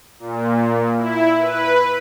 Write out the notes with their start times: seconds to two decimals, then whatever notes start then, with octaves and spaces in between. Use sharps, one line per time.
0.19 A#2
0.97 E4
1.39 B4